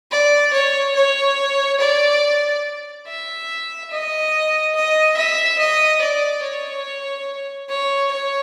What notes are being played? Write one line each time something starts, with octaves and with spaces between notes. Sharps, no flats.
D5
C#5
C#5
D5
E5
D#5
D#5
E5
D#5
D5
C#5
C#5
C#5